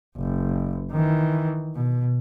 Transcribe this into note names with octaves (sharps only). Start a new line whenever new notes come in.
F#1
D#3 E3
B2